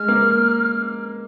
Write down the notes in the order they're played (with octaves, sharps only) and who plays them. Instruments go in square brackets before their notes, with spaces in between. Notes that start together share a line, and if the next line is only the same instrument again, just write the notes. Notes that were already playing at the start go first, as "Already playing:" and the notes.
Already playing: [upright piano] G#3 [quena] F6
[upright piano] A#3